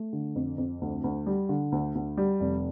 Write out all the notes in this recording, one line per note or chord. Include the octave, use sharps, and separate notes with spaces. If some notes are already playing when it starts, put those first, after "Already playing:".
Already playing: A3
D3
F2
F2
D2
D2
G3
D3
D2
D2
G3
F1